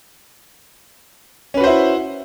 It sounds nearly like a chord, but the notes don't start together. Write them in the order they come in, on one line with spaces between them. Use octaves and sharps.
C#4 B4 F#4 C5 E4